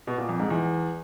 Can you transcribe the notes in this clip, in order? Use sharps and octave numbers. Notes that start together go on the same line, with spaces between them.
B2
A#2
F2
G#2
E2